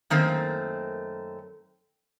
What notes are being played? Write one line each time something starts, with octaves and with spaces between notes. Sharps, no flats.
F#2 D#3 A3 A#3 C4